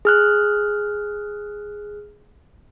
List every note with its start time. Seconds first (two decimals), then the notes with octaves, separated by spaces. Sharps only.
0.05 G#4 F6 F#6